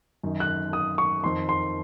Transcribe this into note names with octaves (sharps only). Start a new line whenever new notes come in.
F#2 D#3
F#6
D#6
C#6
F2 D#3 C6
C6